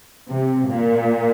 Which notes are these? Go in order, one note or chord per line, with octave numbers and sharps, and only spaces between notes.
C3
A#2